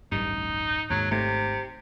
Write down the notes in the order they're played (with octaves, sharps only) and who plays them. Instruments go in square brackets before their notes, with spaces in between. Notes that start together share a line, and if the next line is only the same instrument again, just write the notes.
[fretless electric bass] D1 A1 G2 [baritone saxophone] D#4
[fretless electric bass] D#2 G#2 [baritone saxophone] F#3
[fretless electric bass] G#1 G#2 A3 [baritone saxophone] C3